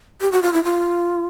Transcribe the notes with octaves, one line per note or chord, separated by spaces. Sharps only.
G4
F#4
F4
E4
F4